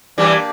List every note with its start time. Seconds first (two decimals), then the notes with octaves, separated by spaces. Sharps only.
0.18 E3 G3 A#3 D4 G4 D5